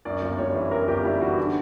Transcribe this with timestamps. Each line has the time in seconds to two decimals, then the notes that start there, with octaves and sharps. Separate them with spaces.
0.05 F#2 D5
0.22 G1
0.38 G3 C#5
0.55 E3
0.71 F#2 A#4
0.88 G1 G4
1.04 G3 E4
1.21 E3 F#4
1.38 D3